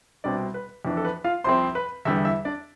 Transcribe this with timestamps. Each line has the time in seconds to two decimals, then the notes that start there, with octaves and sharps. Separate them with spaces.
0.24 C2 B2 G3 C4 D4 D5
0.54 B4
0.85 F2 E3 B3 D4
0.97 A4
1.05 B4
1.24 F4 F5
1.44 C2 C3 F3 C4 C5 C6
1.75 B4 B5
2.05 E2 D3 G3 B3 E4 E5
2.25 E4 E5
2.45 D4 D5